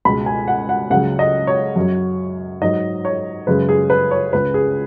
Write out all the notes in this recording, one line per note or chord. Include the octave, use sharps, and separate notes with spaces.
C#2 B2 G#3 B5
G#5
F#5
F#5
C#2 C#3 F#3 F#5
D#5
C#5
F#2 F#3
G#2 F#3 D#5
C#5
F#2 C#3 G#3 B4
G#4
B4
C#5
C#2 C#3 G#3 B4
G#4